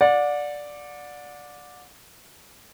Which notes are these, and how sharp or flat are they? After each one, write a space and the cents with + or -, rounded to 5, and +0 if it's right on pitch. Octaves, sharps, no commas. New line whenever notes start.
D5 +0 F#5 -35